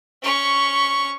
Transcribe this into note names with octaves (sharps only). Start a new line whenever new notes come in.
C#4 C#6